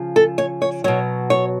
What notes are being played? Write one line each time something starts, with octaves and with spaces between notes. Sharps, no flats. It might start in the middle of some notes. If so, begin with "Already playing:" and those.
Already playing: C#3 F3
A4
C#5
C#5
B2 F#3 C#5
C#5